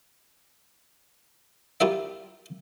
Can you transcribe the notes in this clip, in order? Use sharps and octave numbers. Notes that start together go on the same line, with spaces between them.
E4 F4 G4 A#4 E5 F5